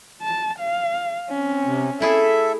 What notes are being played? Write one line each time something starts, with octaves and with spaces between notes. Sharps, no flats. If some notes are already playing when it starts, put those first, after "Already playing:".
A5
F5
C4 C#4
C3
A3 E4 G#4 A4 E5